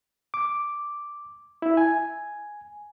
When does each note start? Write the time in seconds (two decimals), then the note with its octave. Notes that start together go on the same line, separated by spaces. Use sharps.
0.34 D6
1.62 E4
1.77 G#5